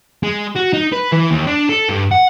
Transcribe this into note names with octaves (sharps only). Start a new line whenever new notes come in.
G#3
F#4
D#4
B4
E3
D#2
D4
A4
G2
F#5